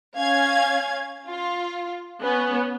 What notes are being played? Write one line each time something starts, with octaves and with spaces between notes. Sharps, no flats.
C#4 F5 G#6
F4
B3 C#4